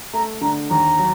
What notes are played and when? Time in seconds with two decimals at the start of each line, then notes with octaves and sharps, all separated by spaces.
0.13 A3 A#5
0.41 D3 A#5
0.69 D#2 A#5
0.99 F#3